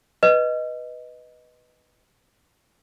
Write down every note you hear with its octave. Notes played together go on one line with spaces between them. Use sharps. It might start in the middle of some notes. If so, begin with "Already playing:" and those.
B4 D#5